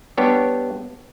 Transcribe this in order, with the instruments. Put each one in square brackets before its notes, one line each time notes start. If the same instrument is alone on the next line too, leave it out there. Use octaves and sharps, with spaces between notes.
[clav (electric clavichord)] G3 B3 D4 G4 C#5